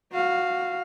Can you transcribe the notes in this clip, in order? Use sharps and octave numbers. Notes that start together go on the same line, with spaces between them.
F#4 F5